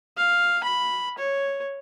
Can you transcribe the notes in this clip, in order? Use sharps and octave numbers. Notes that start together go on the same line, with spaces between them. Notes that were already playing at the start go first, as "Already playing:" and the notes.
F5
B5
C#5